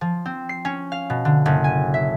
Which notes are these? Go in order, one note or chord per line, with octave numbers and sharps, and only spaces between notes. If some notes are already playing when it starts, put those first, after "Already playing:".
F3
C4
C7
C#4
F5
B2
D3
F#1
G#5
E5